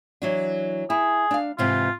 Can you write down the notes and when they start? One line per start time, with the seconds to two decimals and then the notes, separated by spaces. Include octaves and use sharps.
0.22 E3 F#3 D4
0.90 E4 G#4
1.31 D4 F5
1.58 G#2 C3 E3 F4